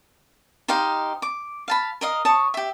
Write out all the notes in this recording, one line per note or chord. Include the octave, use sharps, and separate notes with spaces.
D#4 G4 C5 F5
D6
F5 A5 B5
A#4 D#5 F5
C#5 A5 C#6 D#6
G4 E5